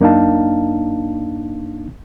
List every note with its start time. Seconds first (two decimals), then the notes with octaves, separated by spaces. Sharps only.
0.01 F#2 A#3 D4 D#4 F5 A5